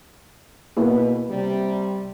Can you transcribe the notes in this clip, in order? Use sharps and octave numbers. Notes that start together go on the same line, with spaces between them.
B2 A#3 E4 G#4 B4
C3 G3